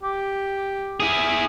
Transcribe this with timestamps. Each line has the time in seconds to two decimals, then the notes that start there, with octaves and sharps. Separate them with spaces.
0.03 G4
1.00 E4 G#4